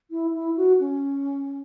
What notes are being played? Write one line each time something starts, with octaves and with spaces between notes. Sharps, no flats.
E4
E4
F#4
C#4